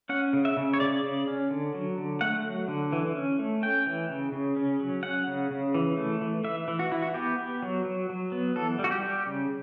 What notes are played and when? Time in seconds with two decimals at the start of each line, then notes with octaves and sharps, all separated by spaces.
0.09 C#4 F#5
0.33 C#3
0.45 E5
0.57 C#3
0.74 C#5
0.80 C#3 D5
1.03 C#3
1.27 C#4
1.50 D3
1.74 F#3
1.98 D3
2.21 A3 F#5
2.44 F#3
2.68 D3
2.93 E3
3.15 C#4
3.39 A3
3.63 C#4 G5
3.86 E3
4.09 C#3
4.32 C#3
4.56 C#4
4.80 F#3
5.03 C#4 F#5
5.27 C#3
5.51 C#3
5.75 E3
5.97 A3
6.22 E3
6.44 E3 E5
6.68 E3
6.79 F#4
6.91 E3 E4
7.02 F#4
7.14 B3 G4
7.38 B3
7.62 F#3
7.85 F#3
8.09 F#3
8.32 B3
8.56 E3 A4
8.79 G3
8.84 F#4
8.91 G4
9.03 G3
9.26 C#3